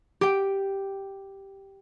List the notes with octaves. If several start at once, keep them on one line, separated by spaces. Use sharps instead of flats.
G4 G5